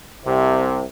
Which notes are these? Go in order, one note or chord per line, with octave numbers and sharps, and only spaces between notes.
C2 C3